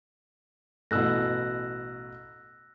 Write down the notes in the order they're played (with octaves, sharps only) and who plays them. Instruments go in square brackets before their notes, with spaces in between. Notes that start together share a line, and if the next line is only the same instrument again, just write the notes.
[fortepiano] A1 B2 [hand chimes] E6 F#6 A#6